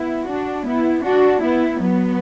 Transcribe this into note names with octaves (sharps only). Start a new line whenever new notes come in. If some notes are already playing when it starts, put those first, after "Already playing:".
Already playing: B3 E4
D4 F#4
B3 E4
D4 F#4
B3 E4
F#3 B3